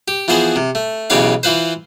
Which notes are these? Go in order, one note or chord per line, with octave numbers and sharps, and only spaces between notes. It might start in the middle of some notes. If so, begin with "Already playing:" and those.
G4
E3 F3 B3 G#4 C5
C3
A3
B1 C#3 E3 G4 C#5 F5
E3 F4 B4 C5